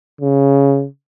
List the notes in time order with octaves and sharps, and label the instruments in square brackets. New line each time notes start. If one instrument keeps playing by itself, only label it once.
[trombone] C#3